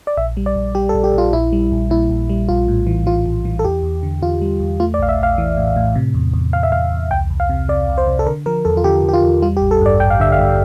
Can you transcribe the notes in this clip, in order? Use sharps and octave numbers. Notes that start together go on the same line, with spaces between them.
D5
A#1 E5
G3
D5
A#1
G3 G4
A4
A#1
G4
A#1 F4
A#1 E4
G3
A#1
A#2 E4
A#1
G3
A#1 F4
A2
E3
E3 F4
A#1
E3
A4
E2 G4
E2
D3
E2 F4
G3
E2
A3 F4
D5
A#1 F5
E5
A#1 F5
E3
A2
A2
C3
E2
E2
E2 F5
E5
E2 F5
E2
C2 G5
C2
F5
C3
C3 D5
C2
C5
C3
A4
D3 A#4
F3 A#4
E2 A4
F4
D3 G4
E2
G4
F4
E2
G3 F4
G4
A1
A4
G2 D5
A1 G5
F5
D3 E5
F5
G2